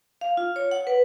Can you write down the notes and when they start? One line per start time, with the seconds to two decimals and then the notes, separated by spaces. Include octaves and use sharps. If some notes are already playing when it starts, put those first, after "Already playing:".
0.21 F5
0.37 F4
0.56 C#5
0.71 F#5
0.87 B4